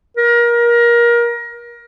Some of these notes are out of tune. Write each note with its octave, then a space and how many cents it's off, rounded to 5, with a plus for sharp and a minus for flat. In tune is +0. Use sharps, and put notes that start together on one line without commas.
A#4 +25